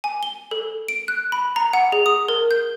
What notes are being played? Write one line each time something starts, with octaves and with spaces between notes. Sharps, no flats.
G#5
G7
A4
D7
F#6
B5
A#5
F#5
G#4
D#6
A#4
G6